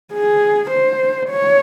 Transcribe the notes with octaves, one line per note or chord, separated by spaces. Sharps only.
G#4
C5
C#5